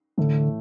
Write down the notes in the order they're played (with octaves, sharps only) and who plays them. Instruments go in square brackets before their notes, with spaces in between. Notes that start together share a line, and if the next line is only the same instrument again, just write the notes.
[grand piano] A2 E3 A3 [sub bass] D3